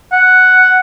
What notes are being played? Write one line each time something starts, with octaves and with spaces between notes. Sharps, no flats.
F#5